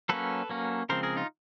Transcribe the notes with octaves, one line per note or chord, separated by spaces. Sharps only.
F#3 A#3 C#4 A4 B4
F#3 A#3 C#4
C#3 F3 G#3 C4 A#4 C5
G#4 A#4
D#4 F4